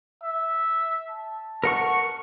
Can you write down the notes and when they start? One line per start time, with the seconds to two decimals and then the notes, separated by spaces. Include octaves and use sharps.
0.23 E5
1.10 A5
1.64 A#4 F#5 C#6